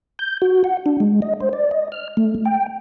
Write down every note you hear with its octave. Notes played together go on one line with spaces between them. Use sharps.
G6
F#4
F#5
D4
G#3
D#5
C5
D5
D#5
F6
A3
G5